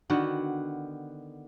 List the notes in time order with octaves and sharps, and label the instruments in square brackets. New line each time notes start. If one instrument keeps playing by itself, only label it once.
[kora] D3 D#3 B3 F#4